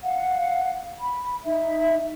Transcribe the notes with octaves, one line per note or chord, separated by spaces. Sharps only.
F5 F#5
B5
D#4 E5